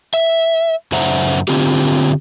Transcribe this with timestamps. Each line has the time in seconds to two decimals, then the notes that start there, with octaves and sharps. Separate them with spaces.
0.14 E5
0.92 F#2 C#3 C5 E5 F#5 A#5
1.48 D3 C4 F4 G4